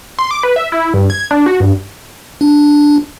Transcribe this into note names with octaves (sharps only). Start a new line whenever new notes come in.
C6
D6
B4
E5
E4
G2
G#6
D4
F#4
G2
D4